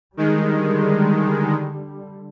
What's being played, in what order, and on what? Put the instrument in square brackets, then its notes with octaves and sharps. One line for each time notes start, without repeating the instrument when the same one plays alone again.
[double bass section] D3 G3 [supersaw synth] D#3 G#3